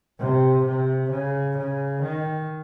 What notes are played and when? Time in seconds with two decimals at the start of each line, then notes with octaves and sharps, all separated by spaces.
0.19 C3
0.65 C3
1.10 C#3
1.57 C#3
2.02 D#3